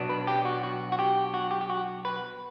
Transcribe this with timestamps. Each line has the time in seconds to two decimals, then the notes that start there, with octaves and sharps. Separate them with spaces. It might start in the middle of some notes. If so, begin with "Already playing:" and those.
Already playing: B1 B2 F#3 B3 D4
0.09 B4
0.27 G4
0.45 F#4
0.63 F#4
0.92 F#4
0.99 G4
1.34 F#4
1.51 G4
1.61 G4
1.70 F#4
2.05 B4